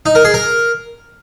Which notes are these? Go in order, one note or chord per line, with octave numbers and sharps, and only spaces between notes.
D#4
A#4
G#4
A#4